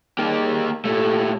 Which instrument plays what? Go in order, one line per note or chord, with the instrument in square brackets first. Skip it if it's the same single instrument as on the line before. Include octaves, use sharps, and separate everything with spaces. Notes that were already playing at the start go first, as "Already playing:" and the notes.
[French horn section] G3 D#4 G#4 [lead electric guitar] A#3 G4
[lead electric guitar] A#2 A3 [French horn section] G4 A4